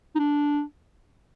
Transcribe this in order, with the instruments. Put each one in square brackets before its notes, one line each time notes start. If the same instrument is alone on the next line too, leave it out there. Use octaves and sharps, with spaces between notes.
[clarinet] D#4
D4